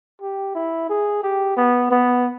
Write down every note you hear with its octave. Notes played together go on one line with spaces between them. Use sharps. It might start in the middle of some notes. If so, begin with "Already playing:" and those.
G4
E4
G#4
G4
B3
B3